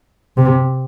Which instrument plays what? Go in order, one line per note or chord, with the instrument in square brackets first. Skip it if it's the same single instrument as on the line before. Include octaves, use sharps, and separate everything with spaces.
[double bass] C3